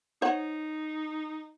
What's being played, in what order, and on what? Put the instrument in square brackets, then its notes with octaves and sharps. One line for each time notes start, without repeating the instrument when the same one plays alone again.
[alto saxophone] D#4 [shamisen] C5 C#5 F#5